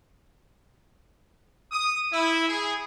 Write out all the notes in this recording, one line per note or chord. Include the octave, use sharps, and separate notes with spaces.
D#6
E4
G#4